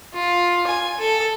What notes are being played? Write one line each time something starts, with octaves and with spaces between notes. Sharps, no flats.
F4
G#5
A4